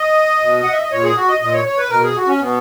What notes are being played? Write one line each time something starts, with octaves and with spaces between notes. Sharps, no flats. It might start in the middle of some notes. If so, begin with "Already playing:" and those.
Already playing: D#5
B2
F#5
E5
D#5
A#2 C#5
G#4
F#4
D#5
A#2 D#5
C#5
C#5
B4
B2 A#4
G#4
F#4
C#4
B2 B3